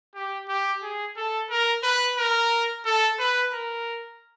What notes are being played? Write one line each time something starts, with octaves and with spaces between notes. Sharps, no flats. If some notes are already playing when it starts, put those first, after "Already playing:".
G4
G4
G#4
A4
A#4
B4
A#4
A4
B4
A#4